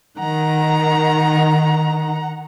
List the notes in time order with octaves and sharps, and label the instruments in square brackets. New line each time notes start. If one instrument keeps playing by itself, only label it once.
[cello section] D#3 [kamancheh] F#5 A#5